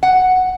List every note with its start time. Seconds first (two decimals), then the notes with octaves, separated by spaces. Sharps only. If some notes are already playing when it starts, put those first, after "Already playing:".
0.03 F#5